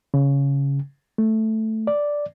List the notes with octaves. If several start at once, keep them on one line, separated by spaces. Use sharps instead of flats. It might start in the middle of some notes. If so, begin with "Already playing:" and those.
C#3
A3
D5